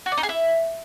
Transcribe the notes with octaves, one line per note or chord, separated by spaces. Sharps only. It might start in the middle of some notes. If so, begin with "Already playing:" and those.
F#4
D5
D#4
G#4
E4